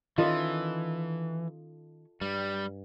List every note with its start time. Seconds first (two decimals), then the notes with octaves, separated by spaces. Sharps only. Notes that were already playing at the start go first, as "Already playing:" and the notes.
0.18 D#3 E3 C#4 F4 A4 D#5
2.21 G2 G3